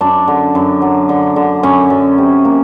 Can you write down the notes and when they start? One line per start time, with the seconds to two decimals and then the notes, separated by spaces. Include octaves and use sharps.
0.01 F#2 D4
0.28 D3
0.55 F#2
0.82 F#3
1.09 D3
1.36 D3
1.63 F#2 C#4
1.90 F#2
2.18 C3
2.45 A#3